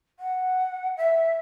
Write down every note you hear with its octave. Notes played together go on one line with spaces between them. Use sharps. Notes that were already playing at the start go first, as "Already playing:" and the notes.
F#5
E5